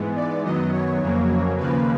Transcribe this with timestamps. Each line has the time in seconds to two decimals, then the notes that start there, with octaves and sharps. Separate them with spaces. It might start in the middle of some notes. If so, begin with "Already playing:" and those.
Already playing: G#2 E3 G#3 B3
0.16 D5
0.44 F#2 D#3 F#3 B3 D#5
0.73 C#5
1.01 F2 C#3 F#3 A#3
1.58 D#2 C#3 F3 A#3 B4